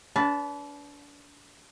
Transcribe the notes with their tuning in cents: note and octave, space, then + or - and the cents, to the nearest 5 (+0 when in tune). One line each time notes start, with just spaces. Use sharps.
D4 -35 B4 +0 A5 +0